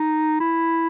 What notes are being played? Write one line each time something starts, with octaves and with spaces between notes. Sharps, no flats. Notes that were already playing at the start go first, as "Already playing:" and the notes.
Already playing: D#4
E4